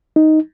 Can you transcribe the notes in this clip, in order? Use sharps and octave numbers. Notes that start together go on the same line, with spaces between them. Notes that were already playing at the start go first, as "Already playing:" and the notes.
D#4